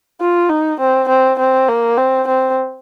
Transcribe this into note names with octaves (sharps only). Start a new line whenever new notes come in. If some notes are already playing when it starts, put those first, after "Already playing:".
F4
D#4
C4
C4
C4
A#3
C4
C4